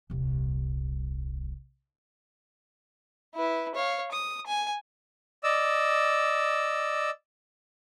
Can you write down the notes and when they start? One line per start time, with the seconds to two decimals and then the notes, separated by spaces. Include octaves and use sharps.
0.10 D#1 C2
3.35 E4 B4
3.75 C#5 F5
4.11 D#6
4.46 G#5
5.44 D5 D#5 E6